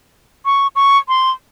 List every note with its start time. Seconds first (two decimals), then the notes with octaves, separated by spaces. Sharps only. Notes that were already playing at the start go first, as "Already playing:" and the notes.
0.45 C#6
0.76 C#6
1.08 C6